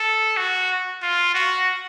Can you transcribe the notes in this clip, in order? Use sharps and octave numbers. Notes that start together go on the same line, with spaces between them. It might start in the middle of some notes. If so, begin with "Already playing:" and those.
Already playing: A4
F#4
F4
F#4